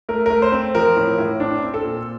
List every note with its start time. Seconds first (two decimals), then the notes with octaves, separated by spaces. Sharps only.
0.09 A3 A#4
0.26 A3 A#4
0.42 C5
0.52 C4
0.75 F3 A#4
0.96 A2
1.18 A2
1.40 C4 D4
1.63 C4
1.74 A4
1.84 A#2